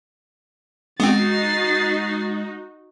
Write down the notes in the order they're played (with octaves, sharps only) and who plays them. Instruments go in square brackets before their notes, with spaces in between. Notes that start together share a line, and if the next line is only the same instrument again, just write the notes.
[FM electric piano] G#3 [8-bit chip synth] B3 C4 [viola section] D#4 F#4 [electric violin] A6 C7